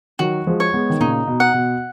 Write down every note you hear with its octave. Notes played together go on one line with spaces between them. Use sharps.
D#3 F#3 F#4
F3 G#3
C#5
G#3 B3
D#3
A#2 C#3 D#4
B2
F#5
B2